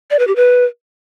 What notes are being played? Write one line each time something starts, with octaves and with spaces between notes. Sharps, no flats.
D5
B4
G4
B4